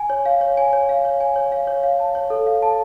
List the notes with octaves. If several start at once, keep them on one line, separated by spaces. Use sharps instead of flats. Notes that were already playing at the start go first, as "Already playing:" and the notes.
Already playing: G#5
C#5
F5
C#5
G#5
C#5
F5
C#5
G#5
C#5
F5
C#5
F5
A5
C#5
A4
F5
A5